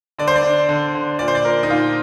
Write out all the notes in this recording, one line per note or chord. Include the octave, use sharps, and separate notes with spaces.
D3 D5
C5
D5
D4
D3
D3
A#2 D5
C5
D5
A#2 A#4
D#4
A#2 F4